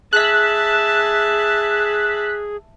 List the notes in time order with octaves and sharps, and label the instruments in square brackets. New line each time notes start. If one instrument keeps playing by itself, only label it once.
[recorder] G#4 [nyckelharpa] E5 A5 [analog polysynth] F#6 B6